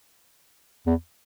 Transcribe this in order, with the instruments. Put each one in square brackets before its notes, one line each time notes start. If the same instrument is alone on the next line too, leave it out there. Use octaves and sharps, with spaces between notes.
[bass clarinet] E2